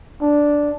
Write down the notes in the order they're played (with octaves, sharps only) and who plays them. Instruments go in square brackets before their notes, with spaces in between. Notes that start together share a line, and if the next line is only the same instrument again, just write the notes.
[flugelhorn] D4